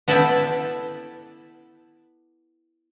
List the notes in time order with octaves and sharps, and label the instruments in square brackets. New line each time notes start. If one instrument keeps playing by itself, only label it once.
[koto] B3 E4 A4 D5 E5 G5